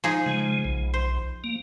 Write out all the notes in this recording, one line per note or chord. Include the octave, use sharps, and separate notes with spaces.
F3 D#4 G#4
C#3 G#3
B1
C5
A#3